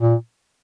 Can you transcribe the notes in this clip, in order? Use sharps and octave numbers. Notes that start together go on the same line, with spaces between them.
A#2